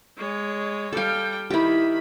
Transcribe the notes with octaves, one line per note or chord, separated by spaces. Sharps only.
G#3 C#5
G3 A4 F5 G5
D#3 E4 G4 B5